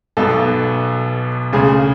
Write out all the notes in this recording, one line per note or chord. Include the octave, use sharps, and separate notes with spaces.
B1 B2 A4
D2 C#3 G#4